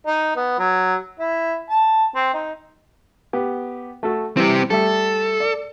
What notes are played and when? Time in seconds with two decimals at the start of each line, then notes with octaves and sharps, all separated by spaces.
0.06 D#4
0.36 B3
0.59 F#3
1.19 E4
1.70 A5
2.15 C4
2.34 D#4
3.33 B3 G4
4.03 A3 F#4 A4
4.37 E3 G3 C4 G4
4.70 G3 A3 A4 E5
5.40 D5